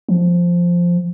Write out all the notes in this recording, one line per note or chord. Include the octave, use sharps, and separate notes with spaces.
F3